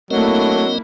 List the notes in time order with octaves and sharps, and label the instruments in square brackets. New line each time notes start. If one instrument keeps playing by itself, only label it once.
[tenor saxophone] F#3 [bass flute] A3 [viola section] A#3 D4 E4 [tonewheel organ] C4 A#4 D#5